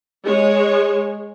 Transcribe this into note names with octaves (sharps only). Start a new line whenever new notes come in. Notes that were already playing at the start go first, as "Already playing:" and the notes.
G#3 C#5